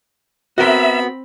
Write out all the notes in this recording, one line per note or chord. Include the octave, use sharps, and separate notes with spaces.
B3 C4 F#4 A#4 E5 B5